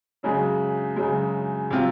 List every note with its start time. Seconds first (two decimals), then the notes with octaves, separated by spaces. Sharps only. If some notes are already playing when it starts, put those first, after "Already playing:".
0.23 F#2 C#3 G#3
0.96 F#2 C#3 G#3
1.70 C3 F#3 C4 F4